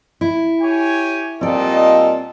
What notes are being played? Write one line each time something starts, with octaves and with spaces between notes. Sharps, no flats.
E4
G4 C#5 G#5
A#2 G3 C4 F4 A4 D5 D#5